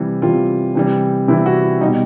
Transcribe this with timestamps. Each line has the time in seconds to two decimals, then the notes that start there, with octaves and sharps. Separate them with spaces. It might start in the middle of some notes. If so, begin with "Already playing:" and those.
Already playing: C3 E3 G3
0.22 C3 E3 G3 F4
0.75 C3 E3 G3
1.28 C3 E3 G3 E4
1.46 F#4
1.63 E4
1.81 G3 D#4
1.85 B2